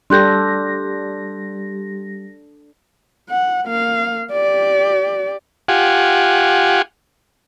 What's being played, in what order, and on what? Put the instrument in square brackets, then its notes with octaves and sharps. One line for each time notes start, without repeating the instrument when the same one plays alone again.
[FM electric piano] G3 G4 A#6 [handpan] D4 A4 [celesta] C6 F#6 G6
[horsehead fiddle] F#5
A#3 F5
G4 D5
[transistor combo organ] F4 G4 F#5 G#5